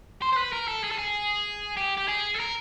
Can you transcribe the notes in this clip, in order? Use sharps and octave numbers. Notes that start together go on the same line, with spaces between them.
C5
C5
B4
A#4
A4
G#4
A4
G#4
G4
G4
G#4
A4
A#4